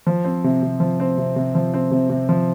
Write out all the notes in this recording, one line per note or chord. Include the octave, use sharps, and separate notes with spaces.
F3
C4
C3
C3
F3
C4
C3
C3
F3
C4
C3
C3
F3